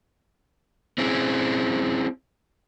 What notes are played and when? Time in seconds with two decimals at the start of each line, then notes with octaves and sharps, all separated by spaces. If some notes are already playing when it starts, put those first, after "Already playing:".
0.98 C4 C#4 E4 G#4